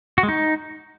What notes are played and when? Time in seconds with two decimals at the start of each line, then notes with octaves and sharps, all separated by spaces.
0.18 F#4
0.23 G#3
0.29 D#4